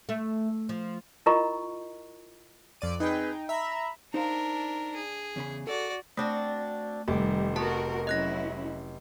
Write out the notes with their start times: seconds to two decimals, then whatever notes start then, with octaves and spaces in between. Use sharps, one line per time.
0.09 A3
0.69 F3
1.26 E4 F4 A#4 D#5 A#5 C#6
2.81 F2 D5 D#7
3.00 C4 D#4 G#4 B4 G5
3.49 E5 A#5 B5
4.14 D4 D#4 A#4 C5 F5
4.96 G#4
5.36 E2 C#3 B5
5.67 F#4 A4 D5
6.17 A3 C4 D4 F#4
7.08 F1 D#3 G3 G4
7.56 B3 F#4 A#4 A5
8.07 F#3 C#4 E4 D#5 F#6 A#6